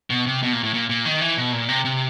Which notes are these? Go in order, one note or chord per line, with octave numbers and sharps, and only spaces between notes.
B2
C3
B2
A#2
A2
A#2
A#2
D#3
E3
B2
A#2
C3
C3